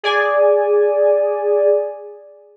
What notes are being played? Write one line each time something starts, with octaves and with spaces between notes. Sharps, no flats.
G#4 D5 G#5